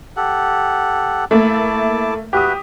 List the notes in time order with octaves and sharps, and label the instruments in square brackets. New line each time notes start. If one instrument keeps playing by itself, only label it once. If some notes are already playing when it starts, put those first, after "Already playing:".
[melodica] G4 A4 F#5
[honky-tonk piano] A3 A#3 E5 [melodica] E4 A5 D6
[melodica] F#4 B4 E5 [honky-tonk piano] G4 D#6